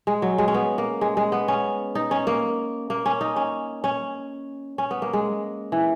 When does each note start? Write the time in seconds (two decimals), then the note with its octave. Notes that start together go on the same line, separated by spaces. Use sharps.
0.07 G#3
0.22 F#3
0.38 G#3
0.48 C#4
0.54 B3
0.78 A#3
1.01 G#3
1.17 G#3
1.32 B3
1.48 C#4
1.95 D#4
2.11 C#4
2.27 A#3
2.90 A#3
3.06 C#4
3.21 D#4
3.36 C#4
3.84 C#4
4.78 C#4
4.91 B3
5.02 A#3
5.13 G#3
5.72 E3